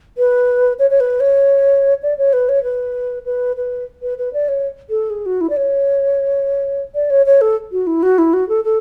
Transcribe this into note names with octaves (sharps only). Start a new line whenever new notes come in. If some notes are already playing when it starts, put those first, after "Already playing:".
B4
C#5
C#5
B4
C#5
D5
C#5
B4
C#5
B4
B4
B4
B4
B4
D5
C#5
A4
G#4
F#4
E4
D5
C#5
D5
C#5
C#5
A4
F#4
E4
F#4
E4
F#4
A4
A4